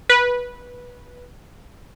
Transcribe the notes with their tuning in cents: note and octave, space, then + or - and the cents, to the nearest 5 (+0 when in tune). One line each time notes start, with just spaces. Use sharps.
B4 -15